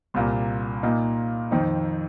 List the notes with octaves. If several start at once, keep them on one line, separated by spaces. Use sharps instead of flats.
C2 A#2 A#3
A#2 A#3 D#4
F2 D#3 C4 D#4